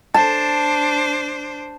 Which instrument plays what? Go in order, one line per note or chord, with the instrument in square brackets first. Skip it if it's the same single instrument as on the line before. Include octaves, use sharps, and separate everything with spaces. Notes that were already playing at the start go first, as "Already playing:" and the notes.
[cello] D4 C5 [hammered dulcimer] A5